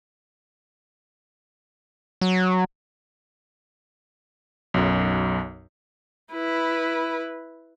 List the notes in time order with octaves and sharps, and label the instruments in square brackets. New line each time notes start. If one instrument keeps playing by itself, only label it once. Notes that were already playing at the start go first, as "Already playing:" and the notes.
[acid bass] F#3
[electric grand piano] B1 F#2
[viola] E4 B4